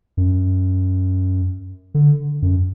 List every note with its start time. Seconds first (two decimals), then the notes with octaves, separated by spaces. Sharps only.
0.17 F#2
1.94 D3
2.42 F#2